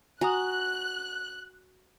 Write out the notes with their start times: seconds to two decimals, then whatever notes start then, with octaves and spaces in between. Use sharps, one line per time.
0.21 F#4 G#5 A#5 D#6 F#6